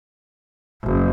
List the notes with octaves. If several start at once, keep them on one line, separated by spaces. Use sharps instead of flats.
F#1